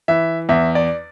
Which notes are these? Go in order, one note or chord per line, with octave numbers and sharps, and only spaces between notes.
E3 E5
E2 E5
D5